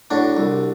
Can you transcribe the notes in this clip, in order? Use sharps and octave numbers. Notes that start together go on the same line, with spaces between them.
A2 D4 F#4
C2